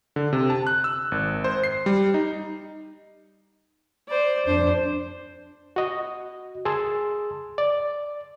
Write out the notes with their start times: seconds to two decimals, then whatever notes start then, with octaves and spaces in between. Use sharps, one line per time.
0.16 D3
0.33 C3
0.50 A5
0.67 F#6
0.84 E6
1.12 G#1
1.44 C5
1.64 C7
1.86 G3
2.14 D#4
4.08 C5 D5
4.46 F2 D4 C5
5.76 F#4 D#5
6.65 G#4 A5 C6 E6
7.58 D5